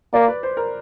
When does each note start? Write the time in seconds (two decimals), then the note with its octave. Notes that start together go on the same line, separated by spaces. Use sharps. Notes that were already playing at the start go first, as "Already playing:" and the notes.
0.14 A#3 D5
0.28 B4
0.43 C5
0.57 A#4